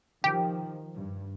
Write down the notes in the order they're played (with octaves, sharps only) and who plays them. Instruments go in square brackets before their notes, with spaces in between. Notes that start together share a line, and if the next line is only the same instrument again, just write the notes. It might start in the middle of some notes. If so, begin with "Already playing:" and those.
[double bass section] D#3 F3 [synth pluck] G4
[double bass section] G2